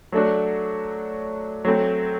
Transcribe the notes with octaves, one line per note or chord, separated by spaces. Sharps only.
F#3 A3 D4 F#4
F#3 A3 C4